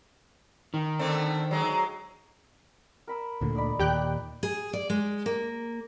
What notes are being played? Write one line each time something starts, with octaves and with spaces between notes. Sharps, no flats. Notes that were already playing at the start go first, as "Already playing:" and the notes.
D#3
D3 A3 C4
F#3 G#3
A#4 B5 E6
D2 A#2 D3
D#4 D5 B5
D#2 A#2 G4 G5 F#6
G#4
D5
G#3
A#3